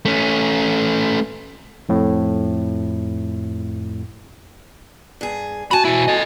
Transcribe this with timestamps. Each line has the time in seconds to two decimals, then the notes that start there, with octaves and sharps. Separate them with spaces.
0.05 A3 C#4
1.89 F2 A2
5.21 G2 G#4
5.71 F#4 G#5 A5 B5
5.85 B2 E4
6.08 A4 D#5